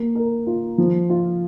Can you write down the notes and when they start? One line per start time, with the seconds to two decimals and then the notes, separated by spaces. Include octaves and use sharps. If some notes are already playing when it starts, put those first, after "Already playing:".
Already playing: A#3
0.15 A#4
0.47 F4
0.78 F3
1.10 F4